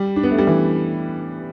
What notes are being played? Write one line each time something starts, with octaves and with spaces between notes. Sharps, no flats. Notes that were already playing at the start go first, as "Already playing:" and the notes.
Already playing: G3
D4
B3
A3
G3
E3